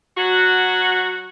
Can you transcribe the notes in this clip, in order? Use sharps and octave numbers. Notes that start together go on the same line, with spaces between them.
F#3 F#4